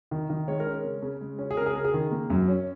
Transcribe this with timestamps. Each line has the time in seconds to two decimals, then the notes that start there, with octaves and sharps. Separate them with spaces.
0.11 D#3
0.30 D#3
0.48 G#3 C#5
0.60 A#4
0.66 C#4
0.84 C#3
1.02 C#3
1.21 G#3
1.39 C#4
1.51 G#4
1.57 C#3 A#4
1.66 G#4
1.75 C#3 A#4
1.85 G#4
1.94 D#3
2.11 A#3
2.30 F#2
2.48 C#4